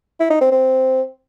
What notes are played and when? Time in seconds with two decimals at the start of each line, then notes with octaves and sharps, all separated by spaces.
0.20 E4
0.30 D#4
0.41 C4
0.52 C4